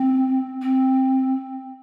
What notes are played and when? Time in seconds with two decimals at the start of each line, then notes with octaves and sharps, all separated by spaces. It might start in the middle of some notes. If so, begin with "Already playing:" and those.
Already playing: C4
0.62 C4